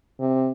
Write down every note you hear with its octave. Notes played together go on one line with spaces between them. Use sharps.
C3